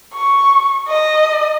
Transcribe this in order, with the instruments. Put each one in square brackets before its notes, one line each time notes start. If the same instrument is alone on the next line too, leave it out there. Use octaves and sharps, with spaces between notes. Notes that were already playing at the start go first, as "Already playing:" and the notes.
[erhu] C#6
D#5